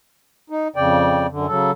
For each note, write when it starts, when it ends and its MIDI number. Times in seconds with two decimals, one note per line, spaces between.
0.50 0.68 63
0.76 1.27 41
0.76 1.27 49
0.76 1.27 74
0.76 1.27 79
1.31 1.47 42
1.31 1.47 50
1.47 1.71 49
1.47 1.71 54
1.47 1.71 69